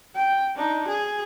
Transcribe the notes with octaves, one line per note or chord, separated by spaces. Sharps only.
G5
D4 D#4
G#4